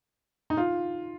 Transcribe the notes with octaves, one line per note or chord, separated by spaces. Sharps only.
D#4
F4